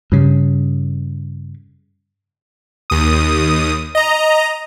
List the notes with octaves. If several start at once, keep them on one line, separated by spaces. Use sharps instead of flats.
G2 C#3
D#2 D#6
D#5 A#5